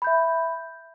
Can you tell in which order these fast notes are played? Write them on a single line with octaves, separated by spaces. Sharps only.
B5 G6 E5